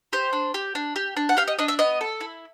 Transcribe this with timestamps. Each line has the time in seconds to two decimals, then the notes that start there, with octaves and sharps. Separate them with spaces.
0.13 G4 C5
0.33 D4
0.54 G4
0.75 D4
0.96 G4
1.17 D4
1.29 F#5
1.37 G4 F5
1.48 D#5
1.59 D4 D#5
1.68 E5
1.79 B3 D#5
2.01 A4
2.21 E4